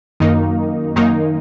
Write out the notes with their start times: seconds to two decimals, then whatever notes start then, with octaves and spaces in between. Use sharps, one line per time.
0.20 F#2 D#3 A#3 D#4
0.96 F#2 D#3 A#3 D#4